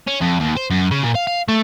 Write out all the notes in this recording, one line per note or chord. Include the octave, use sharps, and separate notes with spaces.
C#4
F2
D#2
C5
F#2
C#3
A#2
F5
F5
A3